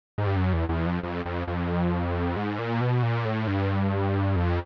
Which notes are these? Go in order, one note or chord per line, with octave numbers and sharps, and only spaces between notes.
G#2
G2
F#2
E2
E2
F2
F2
F2
F2
G#2
A#2
B2
A#2
A2
G2
F2